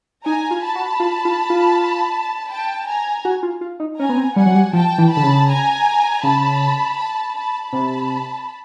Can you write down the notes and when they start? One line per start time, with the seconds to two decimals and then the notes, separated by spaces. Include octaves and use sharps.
0.25 D#4 G#5 A#5
0.51 F4
0.63 A5 B5
0.75 F#4
1.00 F4
1.25 F4
1.50 F4
2.49 G5 A5
2.87 G#5 A#5
3.25 F#4
3.43 F4
3.61 F4
3.80 D#4
3.98 C#4 G#5 A#5
4.09 B3
4.17 C4
4.36 G3 F#5 G#5
4.46 F#3
4.55 G3
4.73 F3 G5 A5
4.98 E3
5.10 A5 B5
5.17 D3
5.23 C#3
5.48 G#5 A#5
6.22 C#3 A5 B5
6.97 A5 B5
7.34 A5 B5
7.72 C3 A5 B5